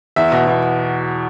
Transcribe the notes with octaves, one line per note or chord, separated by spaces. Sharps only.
E2 E5
B2
B2